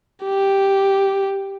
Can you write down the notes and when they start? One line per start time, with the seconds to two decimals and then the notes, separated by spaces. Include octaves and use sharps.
0.24 G4